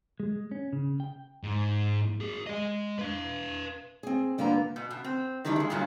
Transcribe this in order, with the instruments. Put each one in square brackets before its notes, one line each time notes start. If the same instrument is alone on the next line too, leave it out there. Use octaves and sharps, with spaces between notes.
[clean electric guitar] G#3
C#4
C#3
G5
[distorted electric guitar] G#2
G#4 A#4
G#3 D#5
B4 F5
[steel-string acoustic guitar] C4 G#4
G2 D3 A#3 B3 F4 A#5
[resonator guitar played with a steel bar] B2
B2
C4
D#3 E3 G3 D4 D#4
A#2 G#3
G2 A#2 D3 F#3 G3